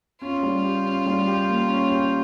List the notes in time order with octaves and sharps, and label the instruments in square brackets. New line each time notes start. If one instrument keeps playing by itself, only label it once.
[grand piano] C#4 [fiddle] F4
[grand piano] G3
G4
C#4
G3
G4
A#3
C#4
G4